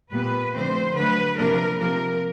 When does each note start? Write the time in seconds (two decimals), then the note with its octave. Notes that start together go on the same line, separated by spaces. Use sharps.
0.13 A#2 G3 B3 B4
0.54 D3 F3 A3 C4 C5
0.96 D3 F#3 A3 B4
1.37 C3 F3 A#3 D4 A#4
1.78 C3 F3 A#3 A#4